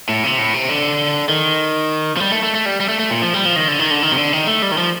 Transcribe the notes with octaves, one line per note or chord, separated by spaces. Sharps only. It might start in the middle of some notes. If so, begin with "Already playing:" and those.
A2
C3
A2
C3
D3
D#3
F3
G3
A3
A3
A3
G3
G3
A3
A3
A#2
F3
G3
F3
D#3
D3
D#3
D3
D#3
C3
D3
D#3
A3
G3
D#3
F3